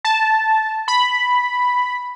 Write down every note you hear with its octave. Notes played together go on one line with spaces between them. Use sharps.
A5
B5